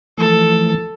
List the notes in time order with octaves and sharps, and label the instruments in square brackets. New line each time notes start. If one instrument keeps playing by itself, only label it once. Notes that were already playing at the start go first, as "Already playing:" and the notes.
[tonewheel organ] E3 F3 A3 [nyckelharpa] A4